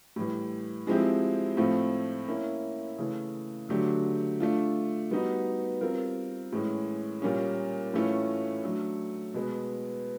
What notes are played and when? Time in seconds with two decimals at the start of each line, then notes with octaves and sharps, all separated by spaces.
0.16 A2 E3 G3
0.87 F3 G#3 C4 E4 G4
1.57 A2 F3 A3 C4 F4
2.28 A#3 C#4 E4
2.98 C#3 E3 A3
3.69 D3 F#3 A3 D4 G4
4.40 A3 D4 F4
5.11 G3 B3 D#4 F#4
5.81 G3 C4 F4 A#4
6.52 A2 E3 G#3 C#4
7.22 A#2 G3 A#3 C#4
7.93 A2 E3 A3 C#4 F4
8.64 F#3 A3 D4
9.34 B2 G#3 B3